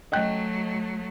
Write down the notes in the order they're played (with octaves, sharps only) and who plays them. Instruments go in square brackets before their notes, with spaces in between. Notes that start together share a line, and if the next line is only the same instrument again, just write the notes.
[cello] F#3 A3 [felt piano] D#5 G5 F#6